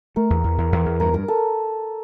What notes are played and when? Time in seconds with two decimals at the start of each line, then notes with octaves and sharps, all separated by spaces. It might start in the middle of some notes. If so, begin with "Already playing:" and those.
0.16 A3 A#4
0.30 E2
0.44 E2
0.58 E2
0.72 E2
0.86 E2
1.00 G2 A#4
1.14 G2 A#4
1.28 A4